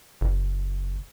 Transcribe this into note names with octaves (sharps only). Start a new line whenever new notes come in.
F#1